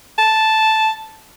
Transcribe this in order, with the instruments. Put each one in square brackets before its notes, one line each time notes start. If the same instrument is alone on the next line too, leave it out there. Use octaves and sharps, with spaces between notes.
[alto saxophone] A5